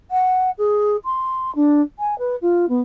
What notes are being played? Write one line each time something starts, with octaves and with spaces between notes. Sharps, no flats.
F#5
G#4
C6
D4
G#5
B4
F4
B3